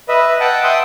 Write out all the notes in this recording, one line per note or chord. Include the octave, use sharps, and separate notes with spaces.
B4 D#5 E5
F#5 G5 A5
E5 G5 C6 D#6